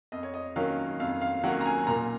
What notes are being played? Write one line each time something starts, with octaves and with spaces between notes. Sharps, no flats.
F2 D#5
C#5
D#5
D#3 F#3 A#3 C#4 F5
F2 F5
F5
D#3 F#3 A#3 C#4 F#5
A#5
G#5
A#2 A#5